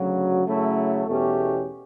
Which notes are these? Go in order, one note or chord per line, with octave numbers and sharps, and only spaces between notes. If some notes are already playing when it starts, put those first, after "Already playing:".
Already playing: D2 C#3 F#3
C#3 F#3 A3 E4
E2 B2 A3 C#4 G4